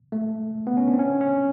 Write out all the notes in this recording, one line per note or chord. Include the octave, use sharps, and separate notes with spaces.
A3
B3
C#4
D4
C4
C#4
C#4